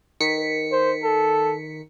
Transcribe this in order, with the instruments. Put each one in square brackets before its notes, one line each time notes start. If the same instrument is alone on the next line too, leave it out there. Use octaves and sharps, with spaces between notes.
[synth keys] D#3 B6 C#7
[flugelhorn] C5
A4